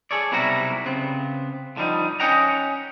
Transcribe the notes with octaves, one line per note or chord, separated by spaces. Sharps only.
G#4 A4 C#5 D5
B1 C3 G3 E4 F#4 A#5
C#3 B3 C4
A2 D3 F3 G3 D#4
C#4 D#5 F#5 G5 A#5